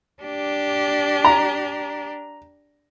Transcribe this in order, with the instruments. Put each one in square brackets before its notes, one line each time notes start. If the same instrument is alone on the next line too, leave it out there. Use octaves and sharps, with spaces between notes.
[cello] D4 G4
[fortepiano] A#5